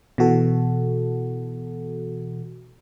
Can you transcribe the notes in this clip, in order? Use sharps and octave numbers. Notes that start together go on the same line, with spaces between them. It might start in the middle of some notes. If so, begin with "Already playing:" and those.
B2 E3 F#4 A4